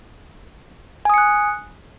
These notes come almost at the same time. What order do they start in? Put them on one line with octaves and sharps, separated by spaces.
G#5 D#6 C#7 F#6